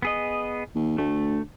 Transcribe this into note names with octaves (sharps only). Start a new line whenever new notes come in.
B3 G#4 D#5
D#2
D2 A3